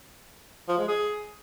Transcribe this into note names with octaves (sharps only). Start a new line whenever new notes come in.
F3
G#3
G#4